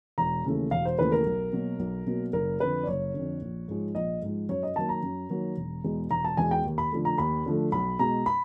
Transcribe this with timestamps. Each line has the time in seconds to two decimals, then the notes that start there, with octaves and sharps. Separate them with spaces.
0.18 E1 A#5
0.45 D#2 C#3 E3 A3
0.71 E1 F5
0.85 C5
0.99 D#2 C#3 E3 A3 B4
1.12 A#4
1.26 B1
1.52 B2 F#3 A#3
1.79 B1
2.06 B2 F#3 A#3
2.33 F#1 A#4
2.60 F2 D3 B4
2.83 D5
2.87 F#1 C#5
3.14 F2 D3
3.41 A#1
3.68 G#2 F3 G#3
3.95 A#1 D#5
4.22 G#2 F3 G#3
4.49 F#2 C#5
4.63 D#5
4.76 D#3 F#3 A#3 A5
4.89 A#5
5.03 F#2
5.30 D#3 F#3 A#3
5.57 E1
5.84 E2 B2 G#3
6.11 E1 A#5
6.24 A5
6.37 E2 B2 G#3 G#5
6.51 G5
6.65 D#2
6.78 B5
6.92 D3 F3 A3
7.05 A#5
7.18 D#2 B5
7.46 D3 F3 A3
7.72 B1 B5
7.99 B2 G#3 A#5
8.26 B5